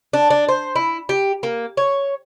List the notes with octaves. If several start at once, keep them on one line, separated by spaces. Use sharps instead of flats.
D4
D4
C5
E4
G4
A#3
C#5